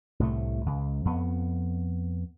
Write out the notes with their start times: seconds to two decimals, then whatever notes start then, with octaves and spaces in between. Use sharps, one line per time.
0.20 C2 A2 C3 A3
0.66 C#2
1.05 F2 B3